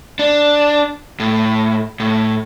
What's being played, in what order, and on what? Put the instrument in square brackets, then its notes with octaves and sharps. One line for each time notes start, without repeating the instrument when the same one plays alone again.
[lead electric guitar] D4
A2
A2